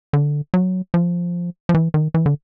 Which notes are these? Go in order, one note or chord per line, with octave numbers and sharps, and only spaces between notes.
D3
F#3
F3
F3
E3
D#3
E3
D3